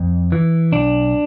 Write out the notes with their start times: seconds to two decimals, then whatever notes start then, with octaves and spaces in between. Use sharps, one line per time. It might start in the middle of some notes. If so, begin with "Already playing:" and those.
Already playing: F2
0.32 E3
0.72 B1 D4